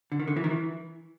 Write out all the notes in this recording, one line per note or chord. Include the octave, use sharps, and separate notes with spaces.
D3
D#3
D3
E3
D#3
E3